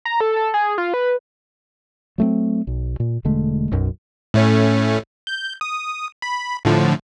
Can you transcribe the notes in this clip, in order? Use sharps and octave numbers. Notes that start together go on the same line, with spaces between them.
A#5
A4
A4
G#4
F4
B4
F#3 A3 A#3 C4
B1
A#2
E1 D3 G#3 A3
B1 F#2
A2 A3 C#4
G6
D#6
B5
A2 D3 F3